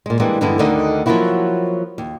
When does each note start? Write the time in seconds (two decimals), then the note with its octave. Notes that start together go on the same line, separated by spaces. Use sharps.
0.06 A#2 G#3
0.20 E3 G3 G#3 A#3 D4
0.41 G2 D3 E3 G#3 B3 E4
0.59 D2 D3 D#3 A3 D#4 D#5
1.06 F3 F#3 A3 A#3 E4 F#4
1.98 D#2